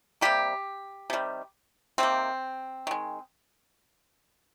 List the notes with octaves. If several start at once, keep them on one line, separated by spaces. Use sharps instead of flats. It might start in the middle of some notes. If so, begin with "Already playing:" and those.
C3 G3 A#3 G4
C3 D#3 G3
C3 D#3 A#3 C4
D#3 G#3